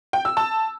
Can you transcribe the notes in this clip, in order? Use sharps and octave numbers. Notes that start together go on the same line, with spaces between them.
G5
E6
A5